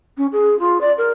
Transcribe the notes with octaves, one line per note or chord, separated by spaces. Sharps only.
C#4
G#4
F4
D5
A#4